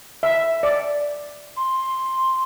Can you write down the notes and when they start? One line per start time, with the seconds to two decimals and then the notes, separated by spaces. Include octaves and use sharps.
0.23 E5
0.63 D5
1.57 C6